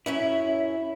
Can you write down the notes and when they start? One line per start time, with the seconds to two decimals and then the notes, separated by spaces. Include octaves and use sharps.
0.06 F#2 C#4 E4 E5